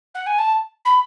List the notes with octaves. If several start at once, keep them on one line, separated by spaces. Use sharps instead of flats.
F#5
G#5
A5
B5